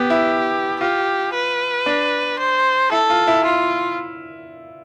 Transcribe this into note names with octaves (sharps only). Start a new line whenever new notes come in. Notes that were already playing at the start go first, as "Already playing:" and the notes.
Already playing: B3 G4
E4
F4 G4
B4
D4
C5
E4 A4
F4
E4
F4